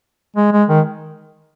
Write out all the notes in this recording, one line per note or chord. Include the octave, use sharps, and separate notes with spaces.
G#3
G#3
D#3